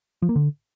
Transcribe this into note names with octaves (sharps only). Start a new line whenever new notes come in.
F3
A#3
D3